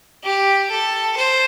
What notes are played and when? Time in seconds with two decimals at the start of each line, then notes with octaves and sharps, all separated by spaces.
0.24 G4
0.70 A4
1.16 C5